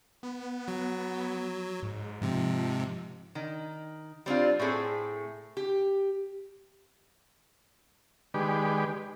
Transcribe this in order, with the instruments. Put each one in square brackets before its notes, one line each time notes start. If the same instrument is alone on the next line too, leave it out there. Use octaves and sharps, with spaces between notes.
[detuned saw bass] B3
[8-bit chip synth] F#3
[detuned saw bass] G#2
[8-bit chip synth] G#2 C3 [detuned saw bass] F3
[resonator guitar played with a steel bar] D#3
G3 C4 D4 F4
A2 C4 G#4 A4
G4
[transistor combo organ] D#3 G#3 G4 B4 D5